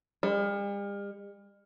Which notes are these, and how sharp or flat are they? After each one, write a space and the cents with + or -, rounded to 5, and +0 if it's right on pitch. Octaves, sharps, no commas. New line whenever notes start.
G3 +45